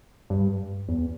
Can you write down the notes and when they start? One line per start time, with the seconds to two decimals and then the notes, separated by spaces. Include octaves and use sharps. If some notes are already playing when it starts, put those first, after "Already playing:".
0.30 G2
0.89 E2